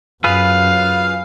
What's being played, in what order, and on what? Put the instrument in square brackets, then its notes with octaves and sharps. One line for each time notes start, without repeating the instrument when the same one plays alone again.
[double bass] F#2 [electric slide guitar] F4 G#4 B4 [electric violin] F5